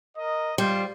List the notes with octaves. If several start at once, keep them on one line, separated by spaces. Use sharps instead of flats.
A#4 D#5
G3 F4 C5